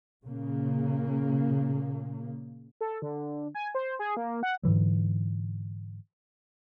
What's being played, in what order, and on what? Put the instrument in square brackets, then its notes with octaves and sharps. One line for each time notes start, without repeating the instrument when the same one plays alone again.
[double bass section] A#2 C#3 A#3
[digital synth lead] A4
D3
G#5
C5
G#4
A#3
F#5
[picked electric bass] G#2 D3 E3 F#3